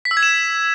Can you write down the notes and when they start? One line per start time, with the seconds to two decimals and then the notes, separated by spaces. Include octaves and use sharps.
0.05 B6
0.11 E6
0.17 G#6
0.23 E7